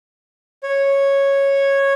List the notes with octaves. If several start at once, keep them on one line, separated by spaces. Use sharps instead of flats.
C#5